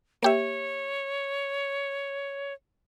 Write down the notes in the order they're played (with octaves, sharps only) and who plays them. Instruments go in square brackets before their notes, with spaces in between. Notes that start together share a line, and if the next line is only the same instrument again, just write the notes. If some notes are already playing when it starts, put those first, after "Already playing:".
[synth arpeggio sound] A#3 G4 E5 [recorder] C#5